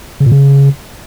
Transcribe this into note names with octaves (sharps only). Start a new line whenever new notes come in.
C#3
A#2
C#3